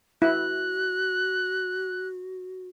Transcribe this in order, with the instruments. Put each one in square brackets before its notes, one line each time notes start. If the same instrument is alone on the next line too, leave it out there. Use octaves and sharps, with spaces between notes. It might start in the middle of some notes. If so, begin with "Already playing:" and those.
[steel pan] E4 [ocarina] F#4 [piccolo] F#6